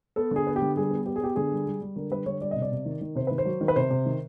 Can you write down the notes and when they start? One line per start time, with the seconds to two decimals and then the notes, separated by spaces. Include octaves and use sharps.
0.16 B3 A4
0.31 D3 G#4
0.47 B3
0.56 G4
0.62 D3
0.77 G3 G#4
0.91 B3
1.06 B3 G4
1.16 G#4
1.21 B3 G4
1.36 D3 G#4
1.52 G3
1.66 G3
1.81 G3
1.96 D3 A#4
2.10 G3 B4
2.26 D3 C#5
2.41 G3 D5
2.51 C3 D#5
2.62 D5
2.72 C3
2.85 D#3
3.01 D#3
3.15 C3 C5
3.27 D#3 B4
3.38 C5
3.45 F#3
3.61 D#3
3.68 B4
3.76 C3 C5
3.90 C3
4.06 D#3